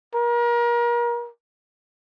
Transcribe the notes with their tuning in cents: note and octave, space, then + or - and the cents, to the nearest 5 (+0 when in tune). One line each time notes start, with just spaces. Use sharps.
A#4 +35